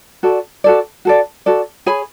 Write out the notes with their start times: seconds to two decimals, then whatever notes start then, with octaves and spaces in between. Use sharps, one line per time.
0.23 F#4 A4 D5
0.64 F#4 A4 D5
1.05 F#4 A4 D5
1.46 F#4 A4 D5
1.86 G#4 C#5 G#5 B5